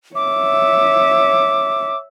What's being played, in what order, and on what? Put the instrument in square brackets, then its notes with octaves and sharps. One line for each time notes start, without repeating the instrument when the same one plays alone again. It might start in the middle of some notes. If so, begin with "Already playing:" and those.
[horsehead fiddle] C#5 E5 [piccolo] D6